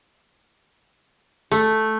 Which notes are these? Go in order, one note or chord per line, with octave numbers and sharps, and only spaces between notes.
A3